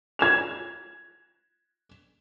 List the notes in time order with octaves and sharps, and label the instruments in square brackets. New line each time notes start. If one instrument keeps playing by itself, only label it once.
[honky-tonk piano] G#6 E7 F7